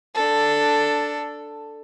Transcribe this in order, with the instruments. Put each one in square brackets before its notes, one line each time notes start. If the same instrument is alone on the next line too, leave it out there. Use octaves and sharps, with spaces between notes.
[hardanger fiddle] D4 A4